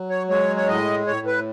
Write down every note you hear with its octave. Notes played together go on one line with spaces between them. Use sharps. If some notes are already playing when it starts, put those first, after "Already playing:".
Already playing: F#3
C#5
G#3 C#5
C#5
A2 D#5
A2 C#5
B4